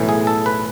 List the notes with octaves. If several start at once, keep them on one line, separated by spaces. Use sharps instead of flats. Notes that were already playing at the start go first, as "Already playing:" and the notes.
Already playing: B1 A2 E3
G#4
A4
B4